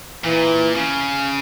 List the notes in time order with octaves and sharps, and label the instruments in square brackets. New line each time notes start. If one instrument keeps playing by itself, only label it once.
[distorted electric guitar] A#2 [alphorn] E3
[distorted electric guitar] C#3